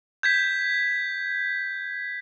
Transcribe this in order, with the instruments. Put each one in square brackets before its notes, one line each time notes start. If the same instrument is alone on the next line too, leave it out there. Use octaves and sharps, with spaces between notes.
[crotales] G6 G#6 B6